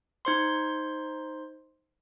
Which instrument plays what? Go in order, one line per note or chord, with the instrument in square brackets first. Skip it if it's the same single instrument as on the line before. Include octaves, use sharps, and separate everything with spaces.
[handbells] D#4 C5 C6